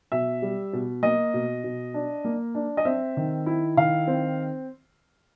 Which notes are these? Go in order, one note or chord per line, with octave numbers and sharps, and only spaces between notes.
B2 E5
G3
B2
A#3 D#5
B2
B2
D4
A#3
D4
D#5
C4 E5
D#3
E4
D#3 F5
C4